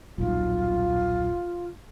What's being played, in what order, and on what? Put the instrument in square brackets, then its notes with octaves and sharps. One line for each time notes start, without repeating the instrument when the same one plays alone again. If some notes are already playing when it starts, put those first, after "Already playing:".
[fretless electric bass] D#1 B1 [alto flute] F4